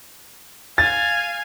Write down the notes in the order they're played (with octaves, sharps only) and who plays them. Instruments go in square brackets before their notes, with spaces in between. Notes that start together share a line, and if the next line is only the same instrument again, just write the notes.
[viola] F5 G#5 [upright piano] A6